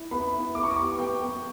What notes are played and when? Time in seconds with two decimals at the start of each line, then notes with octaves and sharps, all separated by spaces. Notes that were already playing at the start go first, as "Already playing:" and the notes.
Already playing: E4
0.11 B3 B5
0.33 E4
0.55 B3 D6
0.63 C#6
0.71 D6
0.77 G4
0.98 B3 G5
1.20 B3